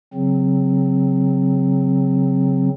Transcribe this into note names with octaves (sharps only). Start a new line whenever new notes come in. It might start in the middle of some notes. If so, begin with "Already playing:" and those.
C#3 F#3 C4